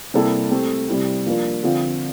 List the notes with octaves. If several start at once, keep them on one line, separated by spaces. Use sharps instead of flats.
C3 G3 A#3 E4 A4
A3 C4 G4
C3 G3 C4 E4 G4
F3 A#3 D4 F4 A#4
D3 F3 C4 F4